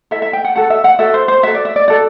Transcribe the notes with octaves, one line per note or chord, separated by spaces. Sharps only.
E4 A4 E5
E5
G5
F#5
F#4 A4 F#5
E5
F#5
F#4 A4 E5
C5
C5
F#4 A4 E5
D5
E5
D5
F#4 A4 D5